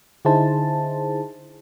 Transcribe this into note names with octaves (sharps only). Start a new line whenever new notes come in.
D3 D#4 E4 G#4 C5 A5